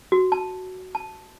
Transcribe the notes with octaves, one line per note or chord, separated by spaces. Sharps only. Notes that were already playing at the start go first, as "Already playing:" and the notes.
F#4
A5
A5